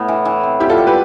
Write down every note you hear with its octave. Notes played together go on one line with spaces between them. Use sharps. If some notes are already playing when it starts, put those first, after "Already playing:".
Already playing: A2 B3
E3
E3
C4
G3 E4 G4
F4 A4
G3
G4 B4